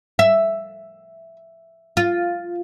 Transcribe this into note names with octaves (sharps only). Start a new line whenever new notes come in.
E5
F4